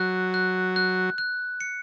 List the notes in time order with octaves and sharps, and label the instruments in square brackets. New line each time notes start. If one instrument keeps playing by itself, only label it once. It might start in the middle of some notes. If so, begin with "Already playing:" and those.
Already playing: [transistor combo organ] F#3 [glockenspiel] F#6
[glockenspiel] F#6
F#6
F#6
C#7